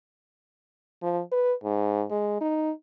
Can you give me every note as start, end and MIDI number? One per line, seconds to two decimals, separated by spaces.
1.02 1.21 53
1.32 1.53 71
1.64 2.04 44
2.10 2.39 56
2.41 2.71 63